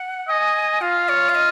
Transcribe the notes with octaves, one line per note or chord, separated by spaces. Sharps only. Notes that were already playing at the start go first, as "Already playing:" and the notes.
Already playing: F#5
D#5 G#5
F4 F5
C#5
F5
D#5